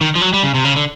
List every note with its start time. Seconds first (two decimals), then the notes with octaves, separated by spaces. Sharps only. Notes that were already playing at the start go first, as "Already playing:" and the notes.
0.01 D#3
0.15 F3
0.21 F#3
0.33 G3
0.43 C#3
0.54 C3
0.65 C#3
0.76 D3